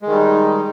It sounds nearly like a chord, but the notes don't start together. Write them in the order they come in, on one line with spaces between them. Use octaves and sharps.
G#3 D#3 G3 D#4